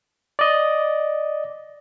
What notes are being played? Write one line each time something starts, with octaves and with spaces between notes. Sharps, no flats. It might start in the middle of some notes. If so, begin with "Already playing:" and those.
D5 D#5